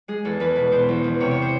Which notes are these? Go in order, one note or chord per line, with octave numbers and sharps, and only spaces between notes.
G#3 G#4
E2 A4
E2 B4
B2 B4
B2 C5
E2
E2
C3 C#5
C#5
C5